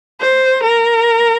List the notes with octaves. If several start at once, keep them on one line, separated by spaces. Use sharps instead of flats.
C5
A#4